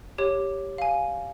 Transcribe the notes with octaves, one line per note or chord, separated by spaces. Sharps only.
G4 C#5
F5 G#5